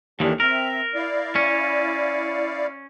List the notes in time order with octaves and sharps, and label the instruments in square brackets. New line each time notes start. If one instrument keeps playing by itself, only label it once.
[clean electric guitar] D#2 D#3 E3 [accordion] A3 D4 G4
[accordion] C4 E5 [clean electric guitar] A#4
[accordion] E4 D5 F5
[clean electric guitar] C#4